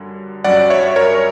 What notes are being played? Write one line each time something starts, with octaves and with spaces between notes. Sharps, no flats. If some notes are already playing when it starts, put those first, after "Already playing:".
Already playing: F#2 D3 G3
G2 F#3 C#4 D5 F#5
C#5 E5
A#4 C#5